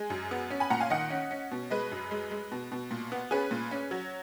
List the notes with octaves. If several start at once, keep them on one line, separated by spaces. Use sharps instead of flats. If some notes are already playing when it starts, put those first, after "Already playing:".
Already playing: G#3 G#5
F#2
B3
C#4
G#5 B5
A#2 F#5 A#5
F5 G#5
D#3 D#5 F#5
C#4
C#4
B2
G#3 B4 D#5
F#2
G#3
G#3
B2
B2
A#2
B3
C#4 G#4 B4
A#2
C#4
F#3